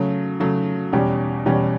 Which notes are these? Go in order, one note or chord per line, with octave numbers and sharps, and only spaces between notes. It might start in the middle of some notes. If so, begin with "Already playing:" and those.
Already playing: C#3 F#3 A3
C#3 F#3 A3
E2 B2 G3 C#4 G4
E2 B2 G3 C#4 G4